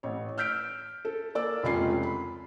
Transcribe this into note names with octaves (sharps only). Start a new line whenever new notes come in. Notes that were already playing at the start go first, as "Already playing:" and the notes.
A1 C#5
E6 F6 G6 B6 D7
A4
A#3 D5 D6 E6
F1 C#2 C#4 F4 G#5 C7
B5